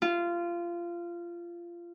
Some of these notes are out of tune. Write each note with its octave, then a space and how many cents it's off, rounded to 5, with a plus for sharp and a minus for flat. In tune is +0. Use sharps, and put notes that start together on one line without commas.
F4 -20